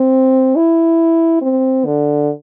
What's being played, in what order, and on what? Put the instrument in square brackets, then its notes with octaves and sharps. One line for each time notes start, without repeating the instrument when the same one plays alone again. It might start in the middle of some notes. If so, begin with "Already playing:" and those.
Already playing: [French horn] C4
E4
C4
D3